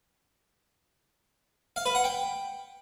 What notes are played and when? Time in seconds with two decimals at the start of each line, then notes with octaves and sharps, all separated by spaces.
1.76 F5
1.86 B4
1.95 F#5
2.04 G5